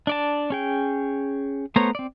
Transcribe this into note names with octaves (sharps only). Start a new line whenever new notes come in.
D4 D5 A5
C#4 G#4 G5
A3 B3 C5 C#5 A#5
C4 D5